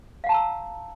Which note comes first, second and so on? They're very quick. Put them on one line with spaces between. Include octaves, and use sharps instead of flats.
F5 F#5 A5 A#5 E6